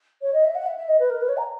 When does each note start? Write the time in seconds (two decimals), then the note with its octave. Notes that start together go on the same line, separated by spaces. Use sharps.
0.21 C#5
0.33 D#5
0.44 E5
0.55 F#5
0.66 E5
0.77 E5
0.88 D#5
0.99 B4
1.10 A#4
1.21 B4
1.28 C#5
1.37 A#5